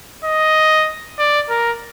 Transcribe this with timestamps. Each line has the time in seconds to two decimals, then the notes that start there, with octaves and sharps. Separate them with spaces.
0.25 D#5
1.19 D5
1.50 A#4